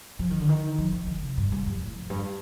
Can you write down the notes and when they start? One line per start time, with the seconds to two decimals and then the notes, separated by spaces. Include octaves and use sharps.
0.19 F3
0.30 D#3
0.40 D3
0.49 D#3
0.78 F3
0.93 F3
1.07 D#3
1.23 C3
1.37 G2
1.52 G2
1.66 F2
1.82 A2
1.96 F2
2.10 G2